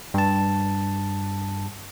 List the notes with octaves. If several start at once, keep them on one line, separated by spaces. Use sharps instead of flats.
G2 A5